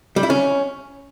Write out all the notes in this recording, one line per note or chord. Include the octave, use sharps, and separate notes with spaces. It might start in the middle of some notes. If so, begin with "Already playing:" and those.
G3
E4
C#4